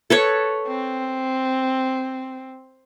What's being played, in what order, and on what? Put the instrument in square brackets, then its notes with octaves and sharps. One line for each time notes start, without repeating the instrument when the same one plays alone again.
[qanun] A4 B4 C#5
[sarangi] C4